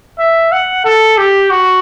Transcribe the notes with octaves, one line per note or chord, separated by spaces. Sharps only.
E5
F#5
A4
G4
F#4